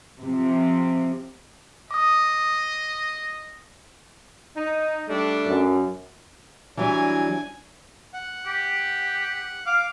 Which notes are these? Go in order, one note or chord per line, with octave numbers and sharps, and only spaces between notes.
C3 F3
D#5 D6 D#6
D#4
G3 A3 D4
F#2
E3 F#3 G3 D4 G#5
F#5
G4
F5 D6